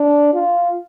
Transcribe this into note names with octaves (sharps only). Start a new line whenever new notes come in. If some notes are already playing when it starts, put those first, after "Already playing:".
Already playing: D4
F4